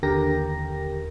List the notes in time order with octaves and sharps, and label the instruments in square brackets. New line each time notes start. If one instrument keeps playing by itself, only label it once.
[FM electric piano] D#2 D3 G4 A#4 G5 A#6